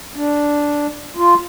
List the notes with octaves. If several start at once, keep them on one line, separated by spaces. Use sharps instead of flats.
D4
F4